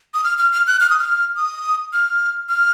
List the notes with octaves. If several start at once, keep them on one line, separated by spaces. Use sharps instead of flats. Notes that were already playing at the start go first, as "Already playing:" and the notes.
D#6
F6
F6
F6
F#6
F6
D#6
F6
D#6
F6
F6